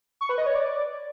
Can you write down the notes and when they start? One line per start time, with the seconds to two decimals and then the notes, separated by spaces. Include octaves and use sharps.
0.21 C#6
0.29 B4
0.38 D#5
0.46 C#5
0.55 D5